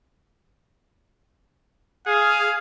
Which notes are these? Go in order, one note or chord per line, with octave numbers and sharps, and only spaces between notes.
G#4 F5